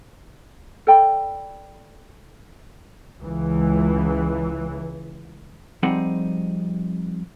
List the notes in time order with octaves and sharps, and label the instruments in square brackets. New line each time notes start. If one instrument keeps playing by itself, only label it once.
[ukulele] A4 D5 G5 B5
[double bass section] C#2 E3
[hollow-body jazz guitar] F3 G3 C4 D#4 G#4 F#5